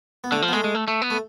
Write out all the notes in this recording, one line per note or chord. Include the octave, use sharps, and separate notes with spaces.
B3
D3 A3
F3
B3
G#3 A3
G#3
A3
A3
B3
A3